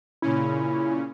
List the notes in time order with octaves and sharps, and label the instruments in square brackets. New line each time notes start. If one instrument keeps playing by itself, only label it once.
[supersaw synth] A#2 C#3 C#4 [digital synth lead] E4